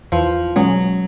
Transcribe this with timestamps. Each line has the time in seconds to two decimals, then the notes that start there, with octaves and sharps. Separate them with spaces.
0.12 E2 F3
0.56 B2 F#3 G#3 C#4